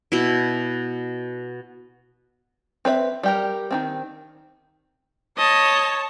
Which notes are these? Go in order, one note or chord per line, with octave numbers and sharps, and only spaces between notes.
B2 E4
C4 B4 C#5 E5
G3 G4 A#4
D#3 E3 C4
C#5 D#5 A5